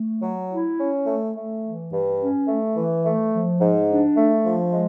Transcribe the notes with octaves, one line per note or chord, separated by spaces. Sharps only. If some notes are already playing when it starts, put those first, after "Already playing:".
Already playing: A3
F#3
E4
C#4
A3
A3
E3
G2
C#4
A3
E3
A3
F3
G#2
D4
A3
F3
G#3